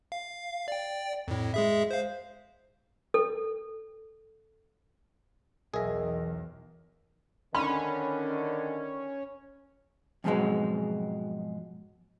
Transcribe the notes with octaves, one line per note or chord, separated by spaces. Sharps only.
F5
D5 G5
F2 A2
G#3 G#4 E5
C5 F5
A4
B1 E2 D#3 G#4 A#4 E5 A#6
D3 D#3 C#4 B5
F2 G#2 B2 D#3 F#3 G#3